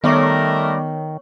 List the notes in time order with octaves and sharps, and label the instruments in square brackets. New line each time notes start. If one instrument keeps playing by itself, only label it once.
[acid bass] D#3 [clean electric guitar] G3 [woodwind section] A3 A#4 [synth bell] B3 C#5 C#6